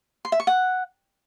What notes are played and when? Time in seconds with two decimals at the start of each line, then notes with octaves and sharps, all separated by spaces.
0.25 C6
0.32 E5
0.40 C#6
0.47 F#5